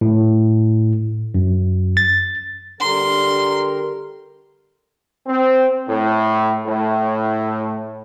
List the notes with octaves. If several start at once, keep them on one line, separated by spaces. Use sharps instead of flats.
A2
F#2
A6
D3 G3 A#4 C6
C4
A2
A2